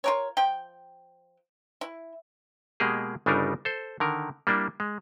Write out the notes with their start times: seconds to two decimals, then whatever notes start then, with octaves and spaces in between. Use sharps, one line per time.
0.04 F4 A#4 C#5
0.37 F3 G5
1.81 E4
2.80 B2 G#3 A#3 G4 G#4
3.26 G1 C#3 G3 D4 D#4 A#4
3.65 A4 C5
4.00 D3 D#3 A#4
4.47 G3 A#3 D4 E4
4.80 G#3